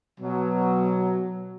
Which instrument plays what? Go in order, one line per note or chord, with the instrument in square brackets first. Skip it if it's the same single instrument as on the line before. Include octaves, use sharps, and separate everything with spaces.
[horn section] B2 F#3